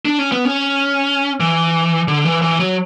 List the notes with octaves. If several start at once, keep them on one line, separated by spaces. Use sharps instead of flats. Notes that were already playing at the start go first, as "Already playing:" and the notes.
D4
C#4
B3
C#4
E3
D3
E3
E3
F#3